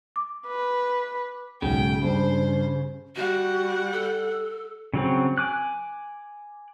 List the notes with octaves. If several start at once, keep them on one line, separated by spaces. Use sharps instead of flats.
D6
B4
B1 G#2 C#3 G5
G2 C5
G3 F#4 F#5
A4
C#3 F#3 C4
G#5 D6 F#6